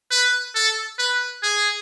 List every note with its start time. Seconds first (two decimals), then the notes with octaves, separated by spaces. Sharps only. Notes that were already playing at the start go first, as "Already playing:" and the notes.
0.11 B4
0.55 A4
0.99 B4
1.43 G#4